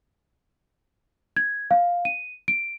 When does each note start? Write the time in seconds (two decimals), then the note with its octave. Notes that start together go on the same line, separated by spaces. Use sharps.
1.36 G#6
1.71 F5
2.05 D#7
2.48 D7